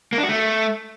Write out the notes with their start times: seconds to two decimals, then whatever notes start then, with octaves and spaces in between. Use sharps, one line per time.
0.13 A#3
0.18 D4
0.23 F#4
0.29 A3